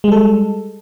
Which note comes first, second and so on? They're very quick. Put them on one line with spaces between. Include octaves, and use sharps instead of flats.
G#3 G3 A4